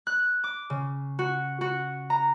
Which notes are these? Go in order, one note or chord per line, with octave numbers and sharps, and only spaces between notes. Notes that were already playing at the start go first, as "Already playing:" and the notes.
F#6
D6
C#3
F#4
F#4
A#5